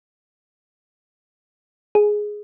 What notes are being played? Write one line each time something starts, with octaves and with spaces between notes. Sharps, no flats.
G#4